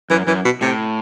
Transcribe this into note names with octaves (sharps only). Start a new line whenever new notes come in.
F#2 E3
F#2 E3
B2
A2 C3